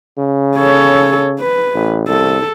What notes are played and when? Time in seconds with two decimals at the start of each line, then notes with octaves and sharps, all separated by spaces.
0.19 C#3
0.57 A4 C#5
1.40 B4
1.75 A1
2.08 C2 A4